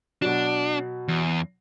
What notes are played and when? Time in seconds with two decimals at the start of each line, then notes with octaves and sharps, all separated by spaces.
0.22 B2 F#3 D4
1.08 E2